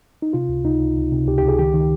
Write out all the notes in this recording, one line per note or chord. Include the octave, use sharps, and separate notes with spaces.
D#4
C3 F4
C#2
C#2 D#4
C#2
C#2
C3
C#2 G4
G4
C#2
G#4
D#3 G4
D#3